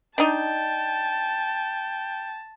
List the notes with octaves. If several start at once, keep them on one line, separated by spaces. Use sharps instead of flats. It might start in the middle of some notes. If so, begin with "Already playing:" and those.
D4 D#4 G5 A5